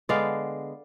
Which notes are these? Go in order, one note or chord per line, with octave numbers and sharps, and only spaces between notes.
D3 G#3 B3 D5 F5